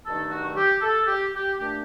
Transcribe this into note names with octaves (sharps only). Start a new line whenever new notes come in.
G2 D#3 F#3 A3 D#4 A4
F#4
G4
A4
G4
G4
A#2 A3 D4 G4